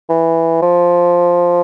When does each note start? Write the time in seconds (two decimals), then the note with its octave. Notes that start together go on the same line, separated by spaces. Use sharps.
0.09 E3
0.62 F3